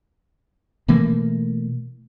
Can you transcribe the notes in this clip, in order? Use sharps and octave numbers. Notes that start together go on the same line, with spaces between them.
B2 E3 A3 A#3